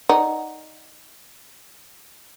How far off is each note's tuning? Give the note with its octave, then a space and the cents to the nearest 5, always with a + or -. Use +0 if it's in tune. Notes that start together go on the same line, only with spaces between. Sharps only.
D#4 +0 D5 +0 F#5 +0